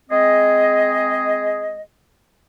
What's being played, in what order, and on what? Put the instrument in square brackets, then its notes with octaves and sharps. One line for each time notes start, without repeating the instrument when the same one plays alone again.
[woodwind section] G#3 C4 G#4 D#5